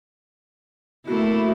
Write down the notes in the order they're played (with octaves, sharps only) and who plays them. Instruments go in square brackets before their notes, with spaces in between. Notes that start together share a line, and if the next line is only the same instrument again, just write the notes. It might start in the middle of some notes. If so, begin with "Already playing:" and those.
[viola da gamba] A3 A#3 E4 [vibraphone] F#4